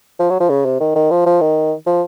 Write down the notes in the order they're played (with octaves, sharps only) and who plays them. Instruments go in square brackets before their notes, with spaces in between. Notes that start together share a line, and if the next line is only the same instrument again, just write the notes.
[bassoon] F3
F#3
F3
C#3
C3
D#3
D#3
F3
F3
D#3
F3